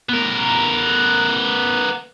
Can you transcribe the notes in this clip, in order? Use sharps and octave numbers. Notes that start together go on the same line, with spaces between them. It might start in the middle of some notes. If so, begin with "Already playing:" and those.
B3 A#4